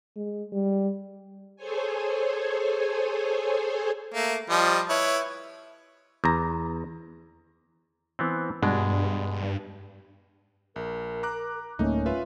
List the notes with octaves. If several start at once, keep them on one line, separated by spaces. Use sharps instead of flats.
G#3
G3
G#4 A4 C5 C#5 G#5
A3 A#3
F3 G3 D#5
E4 B4 C#5
E2 A#5
E3 B3 C4
G2 B2 G#3 D4
A#1 A#4
A#5 D6 F#6
D1 A3 A#3 C#4 D#4
F4 B4 E5